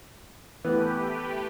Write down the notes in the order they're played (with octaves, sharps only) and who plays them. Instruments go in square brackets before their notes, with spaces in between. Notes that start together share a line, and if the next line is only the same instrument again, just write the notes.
[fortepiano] E3 B3 [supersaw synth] A3 G4 B4